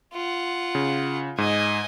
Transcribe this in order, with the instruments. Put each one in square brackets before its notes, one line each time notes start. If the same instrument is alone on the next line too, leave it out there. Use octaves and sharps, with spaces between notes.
[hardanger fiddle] F4 F#5
[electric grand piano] C#3
[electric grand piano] G#2 [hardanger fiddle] D#5 G#5